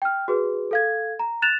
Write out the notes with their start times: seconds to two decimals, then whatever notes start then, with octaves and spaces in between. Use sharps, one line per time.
0.02 G5 F6
0.28 F#4 G#4 B4
0.71 A4 F5 G#6
1.19 A#5
1.42 F#6 A6 E7 F7